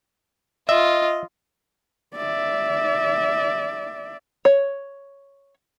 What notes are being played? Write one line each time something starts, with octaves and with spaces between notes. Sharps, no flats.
F4 D#5 E5
D5 E5
C#5